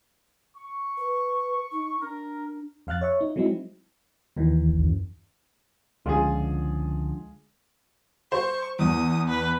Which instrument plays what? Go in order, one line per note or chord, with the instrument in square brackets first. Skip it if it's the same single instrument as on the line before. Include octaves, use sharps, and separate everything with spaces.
[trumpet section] C#6
[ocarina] B4
D#4
[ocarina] D4 [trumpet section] A#4
[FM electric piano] F2 F5 F6 F#6 A6
C#5 E5 C#6
D#4
F#3 G#3 C4 D#4 E4
D#2 D#3 E3
[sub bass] A1
F#2
[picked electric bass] C#2 C#4 [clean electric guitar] D3 F3 [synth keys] G#3 [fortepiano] F4 G#4
[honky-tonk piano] C5 [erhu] C#6
[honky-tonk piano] E2 [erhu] D#6
[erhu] B4